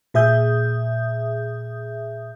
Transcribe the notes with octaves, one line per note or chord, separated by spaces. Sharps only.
A#2 G#4 E5 D#6 G6